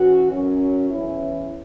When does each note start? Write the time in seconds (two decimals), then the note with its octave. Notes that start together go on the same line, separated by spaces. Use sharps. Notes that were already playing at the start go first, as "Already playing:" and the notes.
Already playing: E3 C#4 F#4
0.31 F#2 F#3 C#4
0.90 E2 E3 C#4 E4